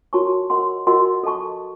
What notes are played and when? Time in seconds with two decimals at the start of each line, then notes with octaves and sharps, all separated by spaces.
0.13 F#4 A#4 C#5 A5 C#6
0.50 F#4 A#4 D#5 F#5 C6
0.87 F#4 A#4 D#5 F#5 C6
1.23 A4 D#5 A5 C#6